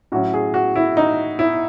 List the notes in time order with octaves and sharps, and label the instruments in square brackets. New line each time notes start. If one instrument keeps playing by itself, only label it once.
[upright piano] A2 F#3 C#4 F#4
G#4
F#4
E4
D#4
E4